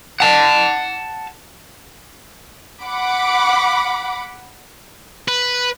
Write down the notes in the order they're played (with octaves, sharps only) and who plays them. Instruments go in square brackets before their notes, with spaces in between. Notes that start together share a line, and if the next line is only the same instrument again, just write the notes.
[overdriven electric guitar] F#5 A5
[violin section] F#5 B5 D6
[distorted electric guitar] B4